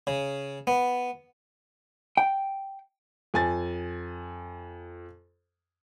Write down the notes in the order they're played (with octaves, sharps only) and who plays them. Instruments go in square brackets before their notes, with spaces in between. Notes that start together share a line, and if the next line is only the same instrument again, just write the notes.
[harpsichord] C#3
B3
[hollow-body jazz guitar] G5
[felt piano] F2 G#5 A6